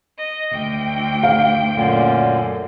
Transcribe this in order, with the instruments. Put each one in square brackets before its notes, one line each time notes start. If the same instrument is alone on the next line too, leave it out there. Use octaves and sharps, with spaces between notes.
[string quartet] D#5
D2 G5
[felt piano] F5
[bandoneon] F#2 A#2 D3